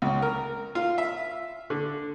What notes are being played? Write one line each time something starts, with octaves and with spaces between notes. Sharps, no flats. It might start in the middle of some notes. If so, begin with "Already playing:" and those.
C#2
A#4
F4
E5
D3